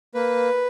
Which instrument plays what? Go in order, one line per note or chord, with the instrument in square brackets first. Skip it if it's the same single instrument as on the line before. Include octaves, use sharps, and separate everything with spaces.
[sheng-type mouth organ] A#3 B4